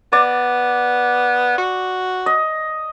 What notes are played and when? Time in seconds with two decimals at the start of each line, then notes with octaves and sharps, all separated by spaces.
0.13 B3 D5
1.58 F#4
2.26 D#5